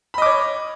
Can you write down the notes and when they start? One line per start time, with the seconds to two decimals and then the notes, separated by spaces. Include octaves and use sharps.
0.14 B5
0.18 D#5
0.22 D6
0.26 C#5